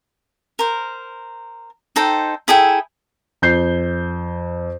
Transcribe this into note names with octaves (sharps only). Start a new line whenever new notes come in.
A#4 C5
D#4 A4 C5 G5
E4 G#4 A4 G5
F2 G6 C7